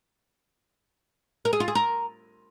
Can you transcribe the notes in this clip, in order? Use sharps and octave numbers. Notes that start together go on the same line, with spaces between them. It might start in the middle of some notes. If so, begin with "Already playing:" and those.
A#4
G#4
F4
G#4
A#4